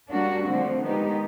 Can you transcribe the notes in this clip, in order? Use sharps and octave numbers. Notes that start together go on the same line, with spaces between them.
G3 A#3 D4 F#4
D3 F3 A3 C4
D#3 G#3 B3 D#4 G4